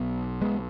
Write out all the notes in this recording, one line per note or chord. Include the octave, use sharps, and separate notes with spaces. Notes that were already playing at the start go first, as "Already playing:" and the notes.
Already playing: B1 B2
G#3 B3